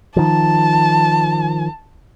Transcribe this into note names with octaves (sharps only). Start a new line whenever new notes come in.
D#3 F3 A5